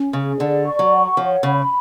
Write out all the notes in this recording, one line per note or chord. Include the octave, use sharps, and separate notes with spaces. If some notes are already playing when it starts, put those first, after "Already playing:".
Already playing: C#4
C#3 G#4
D3 D5
C#6
F#3
F#5
F3 C#5
C#3 B5